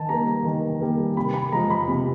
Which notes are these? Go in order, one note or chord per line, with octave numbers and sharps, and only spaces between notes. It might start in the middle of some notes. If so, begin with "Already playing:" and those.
Already playing: D#3 G#5 A5
G3 A#3 A#5
A#5
D#3
G3 A#3
C3 B5
B5
F3 G#3 A#5
B5
C3